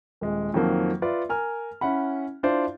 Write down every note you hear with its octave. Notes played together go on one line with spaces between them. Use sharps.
D#1 G#3
F2 D#3 F3 F#3 A#3 C4
F4 B4 D5 E5
A#4 G#5 F6
C#4 E4 F#5 B5
D4 E4 F4 C5 D5 F5